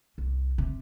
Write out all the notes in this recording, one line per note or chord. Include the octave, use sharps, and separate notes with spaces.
C2
C3